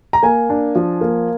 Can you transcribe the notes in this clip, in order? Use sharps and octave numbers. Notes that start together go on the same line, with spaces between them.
A#5
A#3 G#5
D4
F3
A#3